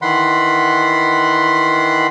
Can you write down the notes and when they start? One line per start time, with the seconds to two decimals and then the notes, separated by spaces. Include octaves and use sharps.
0.02 D#3 E3 F#5 B5 C6